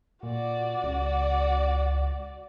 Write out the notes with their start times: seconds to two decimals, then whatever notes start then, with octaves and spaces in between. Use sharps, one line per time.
0.23 A#2 F#4 D5
0.83 C#2